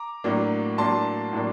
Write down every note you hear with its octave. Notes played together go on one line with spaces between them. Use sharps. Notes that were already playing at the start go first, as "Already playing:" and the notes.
Already playing: A#5 D6
A2 F#3 A#3 D4
A2 F#3 A#3 D4 A5 C6
A2 F#3 A#3 D4